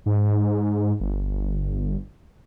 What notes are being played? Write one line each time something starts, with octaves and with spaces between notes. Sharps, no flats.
G#2
G1